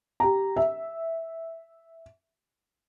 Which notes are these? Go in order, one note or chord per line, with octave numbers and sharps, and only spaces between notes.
G4 A#5
E5